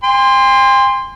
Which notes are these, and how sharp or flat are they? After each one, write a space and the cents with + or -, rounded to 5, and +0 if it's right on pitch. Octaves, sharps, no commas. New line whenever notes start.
G5 +45 C6 +0